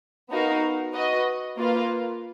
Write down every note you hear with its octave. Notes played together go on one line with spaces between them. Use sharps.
B3 D#4 F#4 A#4 F5
F#4 B4 D#5
A#3 F4 B4 F5